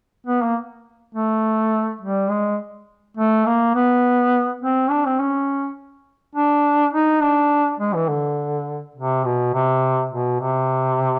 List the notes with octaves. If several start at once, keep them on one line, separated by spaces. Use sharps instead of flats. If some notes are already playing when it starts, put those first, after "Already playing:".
B3
A#3
A3
G3
G#3
A3
A#3
B3
C4
D4
C4
C#4
D4
D#4
D4
G#3
E3
D3
C3
B2
C3
B2
C3